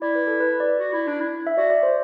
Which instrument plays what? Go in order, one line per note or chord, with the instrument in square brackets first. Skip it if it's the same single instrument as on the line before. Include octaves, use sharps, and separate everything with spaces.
[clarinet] E4 [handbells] D5
[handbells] B4
A4
B4
D5
[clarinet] F#4
E4
D4
E4
[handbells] E5
[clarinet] F#4 [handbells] D5
[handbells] D5
C5